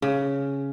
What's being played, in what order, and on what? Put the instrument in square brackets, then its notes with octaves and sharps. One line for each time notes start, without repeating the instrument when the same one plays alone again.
[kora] C#3